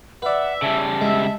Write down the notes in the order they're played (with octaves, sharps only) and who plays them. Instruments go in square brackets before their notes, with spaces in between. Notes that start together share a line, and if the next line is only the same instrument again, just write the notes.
[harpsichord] B4 D5 [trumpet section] E5 [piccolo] F#5
[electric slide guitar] C#3 G3 [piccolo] A5
[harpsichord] G#3 [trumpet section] E5